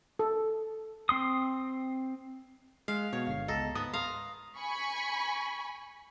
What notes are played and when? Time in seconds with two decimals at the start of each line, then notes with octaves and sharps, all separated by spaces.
0.19 A4
1.09 C4 C6 D#6
2.88 G#3 F5
3.13 B2 C#5
3.27 G1 D3 F5 C7
3.48 C#2 B3 A4 D#5 A#5 A#6
3.75 G#2 B3 D#6
3.93 F5 A#5 C6
4.58 G#5 B5 C#6